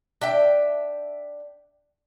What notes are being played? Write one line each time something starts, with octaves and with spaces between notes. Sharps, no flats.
D4 E5 G5